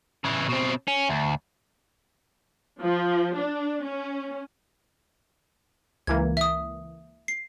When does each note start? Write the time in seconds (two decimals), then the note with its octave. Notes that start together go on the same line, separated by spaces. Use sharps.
0.24 C#3 E3
0.49 B2 C4
0.88 C#4
1.09 D2
2.81 F3
3.39 D4
3.86 C#4
6.07 C#2 E3 A#3 G#6
6.37 E5 D#6
7.28 C7